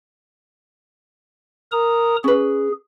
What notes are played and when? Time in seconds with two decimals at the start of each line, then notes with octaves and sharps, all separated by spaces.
1.72 A#4 A#5 D#6
2.24 C#4 G#4 B4